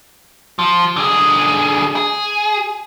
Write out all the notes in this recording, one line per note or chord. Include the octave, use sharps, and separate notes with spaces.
F3
D3 G#4
G#4